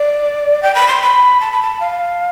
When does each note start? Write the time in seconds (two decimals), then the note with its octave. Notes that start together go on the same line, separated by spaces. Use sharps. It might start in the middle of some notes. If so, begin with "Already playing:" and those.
Already playing: D5
0.63 G5
0.75 B5
0.88 C6
1.02 B5
1.41 A5
1.52 B5
1.63 A5
1.80 F5